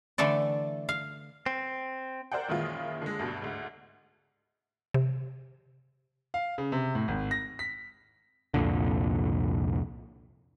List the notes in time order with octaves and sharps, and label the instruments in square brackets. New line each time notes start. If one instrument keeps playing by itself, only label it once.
[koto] D3 E3 A3 A4 D5
F5
[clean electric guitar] C4
[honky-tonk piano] A#4 C5 D5 F#5 G5
F#2 A#2 D#3 E3 G#3 F4
D3 G#3
D2 G2 B2
D2 G#2
[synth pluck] C3
[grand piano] F5
C#3
C3
A2
G#1
A#6
B6
[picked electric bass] C2 F2 A#2 D3